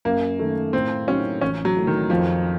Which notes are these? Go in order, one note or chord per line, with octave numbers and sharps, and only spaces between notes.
F#2 A#3
D#3 A3
A2 C4
F#3 C4 C#4 D#4
A1 C#4
F#3
A2 A3
D#3
F2 F3